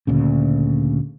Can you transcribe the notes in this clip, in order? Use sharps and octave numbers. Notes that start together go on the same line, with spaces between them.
D2 A#2 C#3